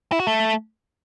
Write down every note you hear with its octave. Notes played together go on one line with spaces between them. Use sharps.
E4
F#4
A3